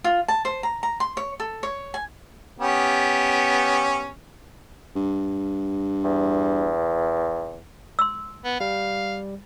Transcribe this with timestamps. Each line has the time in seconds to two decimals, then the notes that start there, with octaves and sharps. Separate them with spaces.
0.04 F4
0.28 A5
0.45 C5
0.63 A#5
0.83 A#5
1.00 C6
1.17 C#5
1.40 A4
1.63 C#5
1.94 G#5
2.60 B3 C#4 G4
4.96 G2
6.04 E2
7.99 C6 E6
8.45 B3
8.61 G3 F5